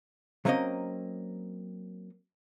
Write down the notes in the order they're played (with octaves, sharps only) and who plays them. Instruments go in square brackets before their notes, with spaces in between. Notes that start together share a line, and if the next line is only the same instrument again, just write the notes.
[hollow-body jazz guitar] F#3 A3 A#3 C4 C#4 D#5